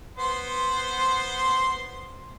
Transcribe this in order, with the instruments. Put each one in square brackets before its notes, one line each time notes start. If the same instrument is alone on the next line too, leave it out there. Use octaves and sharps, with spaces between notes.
[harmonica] B3 C5 C6